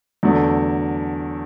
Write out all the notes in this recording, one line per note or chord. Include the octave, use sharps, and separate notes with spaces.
E2 D3 F#3 A3